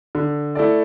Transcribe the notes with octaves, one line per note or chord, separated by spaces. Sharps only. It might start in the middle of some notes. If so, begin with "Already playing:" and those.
D3
A3 E4 A4 D5